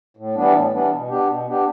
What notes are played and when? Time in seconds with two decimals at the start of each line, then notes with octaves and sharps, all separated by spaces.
0.17 A2
0.35 E3 G3 B3 D4
0.53 A2
0.72 E3 G3 B3 D4
0.91 B2
1.09 B3 D4 G4
1.27 B2
1.46 B3 D4 G4